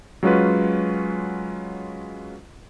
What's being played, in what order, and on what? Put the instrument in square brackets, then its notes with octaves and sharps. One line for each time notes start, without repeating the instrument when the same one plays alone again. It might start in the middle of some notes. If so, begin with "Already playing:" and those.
[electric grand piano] F#3 G#3 C#4 F4 F#4 B4